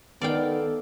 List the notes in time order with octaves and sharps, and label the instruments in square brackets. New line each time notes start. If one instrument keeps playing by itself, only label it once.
[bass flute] D#3 [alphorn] B3 [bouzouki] A4 [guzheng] D5 F5 G5